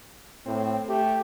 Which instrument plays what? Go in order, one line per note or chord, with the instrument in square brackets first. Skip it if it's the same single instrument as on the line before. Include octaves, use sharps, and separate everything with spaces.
[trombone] A2 [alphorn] C4
[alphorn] A3 [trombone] G4